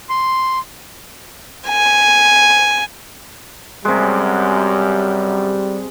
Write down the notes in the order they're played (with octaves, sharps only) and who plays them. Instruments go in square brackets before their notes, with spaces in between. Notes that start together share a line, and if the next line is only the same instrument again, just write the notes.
[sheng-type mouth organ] C6
[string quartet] G#5
[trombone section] F#2 [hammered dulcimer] C3 G#3 [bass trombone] G3